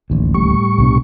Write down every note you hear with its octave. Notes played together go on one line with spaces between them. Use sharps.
D1 A1 D#2
A2 G3 C#6
C2 B2 D4